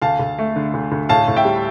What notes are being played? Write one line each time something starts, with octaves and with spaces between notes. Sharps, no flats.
D2 F5 A5
D2
A3
D3
D2
D2
A2 F5 A5
A2
E5 G5
G3